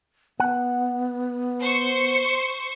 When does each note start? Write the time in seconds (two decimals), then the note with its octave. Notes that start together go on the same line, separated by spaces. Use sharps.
0.40 B3 F#5
1.61 C5 C#6